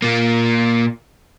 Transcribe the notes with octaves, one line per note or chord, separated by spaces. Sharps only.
A#2 A#3